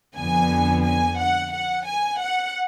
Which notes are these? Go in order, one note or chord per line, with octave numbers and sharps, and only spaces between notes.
F2 D3 F3 B3 G#5
G#5
F#5
F#5
G#5
F#5